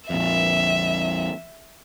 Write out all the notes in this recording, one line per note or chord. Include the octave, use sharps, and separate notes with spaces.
A#1 F2 E5